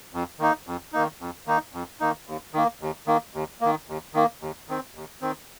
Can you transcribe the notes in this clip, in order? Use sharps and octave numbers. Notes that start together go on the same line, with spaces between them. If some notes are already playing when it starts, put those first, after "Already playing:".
F2
D#3 A#3 D#4
F2
D#3 A#3 D#4
F2
D#3 A#3 D#4
F2
D#3 A#3 D#4
D#2
D#3 A#3
D#2
D#3 A#3
D#2
D#3 A#3
D#2
D#3 A#3
D#2
D#3 C4
D#2
D#3 C4